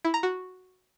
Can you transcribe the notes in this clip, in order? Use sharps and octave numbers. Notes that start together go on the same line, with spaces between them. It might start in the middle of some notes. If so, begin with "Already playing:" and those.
E4
A#5
F#4